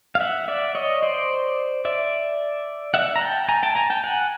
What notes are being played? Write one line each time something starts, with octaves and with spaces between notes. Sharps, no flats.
F5
E5 F#5
D5 E5
C#5 D#5
C5 D5
D5 E5
E5 F#5
A#5
G5 A5
G#5 A#5
G5 A5
G#5 A#5
G5 A5
F#5 G#5